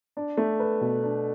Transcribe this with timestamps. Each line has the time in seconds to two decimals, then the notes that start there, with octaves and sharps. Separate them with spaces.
0.17 D4
0.37 A3
0.60 B4
0.81 B2
1.03 D4